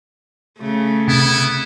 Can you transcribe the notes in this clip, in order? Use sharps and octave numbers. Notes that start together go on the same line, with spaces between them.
C#3 A3
C3 B3 E4